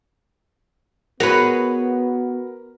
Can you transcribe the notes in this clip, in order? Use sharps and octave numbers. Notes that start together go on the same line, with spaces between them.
B3 F#4 G#4 A#4 B4 C#5